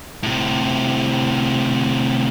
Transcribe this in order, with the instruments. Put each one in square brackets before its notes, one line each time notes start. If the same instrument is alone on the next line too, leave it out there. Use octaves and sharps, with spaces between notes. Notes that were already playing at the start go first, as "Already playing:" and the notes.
[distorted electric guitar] A2 C3